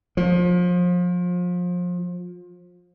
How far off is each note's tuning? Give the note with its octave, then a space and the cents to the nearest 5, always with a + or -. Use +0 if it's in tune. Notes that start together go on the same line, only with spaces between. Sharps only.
F3 +30